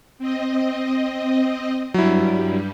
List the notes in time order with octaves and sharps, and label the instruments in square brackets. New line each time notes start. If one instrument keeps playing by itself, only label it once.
[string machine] C4 D#5
[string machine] G2 G3 [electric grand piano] F#3 E4